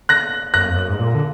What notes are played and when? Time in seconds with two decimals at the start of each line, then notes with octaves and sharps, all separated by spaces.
0.09 F#6 A#6
0.54 F#2 F#6 A#6
0.69 F2
0.77 F#2
0.89 G#2
0.99 A#2
1.15 D3